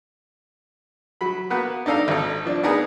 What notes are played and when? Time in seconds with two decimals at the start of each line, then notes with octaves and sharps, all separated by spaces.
1.21 F#3 B5
1.50 A#3 B3 F#4 B4
1.86 D4 D#4 A4 F5 A#5
2.08 G#1 A4
2.45 F3 D4
2.63 B3 D4 D#4 G#4 A#4 B4